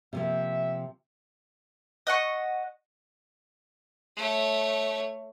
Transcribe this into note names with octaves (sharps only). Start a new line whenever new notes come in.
C3 F3 A#3 E5
D#5 F#5 C#6
A3 C#5